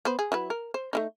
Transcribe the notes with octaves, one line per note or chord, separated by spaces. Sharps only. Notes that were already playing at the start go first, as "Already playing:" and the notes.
B3 B4 C5
G#4
F#3 E4 B4
A#4
C5
A3 C#4 D#4